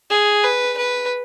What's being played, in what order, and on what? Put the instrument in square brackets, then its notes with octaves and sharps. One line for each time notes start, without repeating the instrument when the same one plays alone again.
[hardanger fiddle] G#4
B4
B4